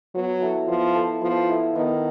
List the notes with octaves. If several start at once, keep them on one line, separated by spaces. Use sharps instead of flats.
F#3 B3
E4 A4
F3 B3
E4 A4
F3 B3
E4 A4
D#3 B3